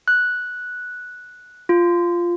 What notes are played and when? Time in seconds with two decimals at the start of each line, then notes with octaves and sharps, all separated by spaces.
0.08 F#6
1.69 F4